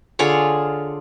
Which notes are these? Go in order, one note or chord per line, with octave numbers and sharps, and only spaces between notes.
D3 F4 G#4 C#5